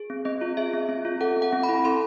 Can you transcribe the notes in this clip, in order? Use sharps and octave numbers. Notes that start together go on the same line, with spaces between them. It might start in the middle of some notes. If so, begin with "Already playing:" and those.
Already playing: G#4
C4
C4 D#5
F4
G#4 E5
C4
C4
F4
A4 F#5
C4
F#5
C4
B5
E4
A4 C6